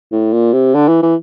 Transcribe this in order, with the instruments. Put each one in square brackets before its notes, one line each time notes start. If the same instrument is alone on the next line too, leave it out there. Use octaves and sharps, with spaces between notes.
[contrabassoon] A2
A#2
C3
D3
E3
E3